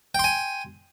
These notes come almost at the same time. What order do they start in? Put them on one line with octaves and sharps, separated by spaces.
G5 C6 G#5